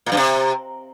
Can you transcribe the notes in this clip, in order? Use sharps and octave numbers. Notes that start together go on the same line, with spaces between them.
A#2
G2
C3